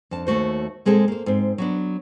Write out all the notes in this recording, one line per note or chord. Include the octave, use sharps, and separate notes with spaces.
F2 D4 A5
D#2 A3 F#4 C5
A#2 G#3 C4 G#4 A4
A#3 C5
G#2 C4
F#3 B3 D4